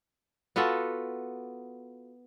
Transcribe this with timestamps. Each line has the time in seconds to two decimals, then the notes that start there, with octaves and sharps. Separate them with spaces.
0.56 B3 F4 F#4 A4